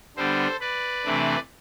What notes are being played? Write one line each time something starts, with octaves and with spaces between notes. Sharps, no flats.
D3 G3 B3 D4 A4 C5
B4 D5
C3 E3 A3 D4